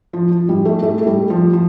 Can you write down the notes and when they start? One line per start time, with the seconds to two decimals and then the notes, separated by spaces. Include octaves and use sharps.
0.13 F3
0.31 F3
0.49 G3
0.65 A3
0.82 A3
1.01 A3
1.06 G3
1.30 F3
1.53 F3